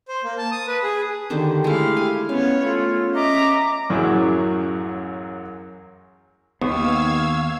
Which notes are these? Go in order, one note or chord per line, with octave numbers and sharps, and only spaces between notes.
C5
A#3
A5
D#6
B4
G#4
D3 D#3 G4 C5
G#3 A3 E4 F5
G#5
B3 C#4 C#5 F5
A3 F4
D#5 E5 A#5 D6
A1 F#2 F#3 E4 G#4 D6
D#2 D#3 B3 F5 C#6 D#6 E6 G#6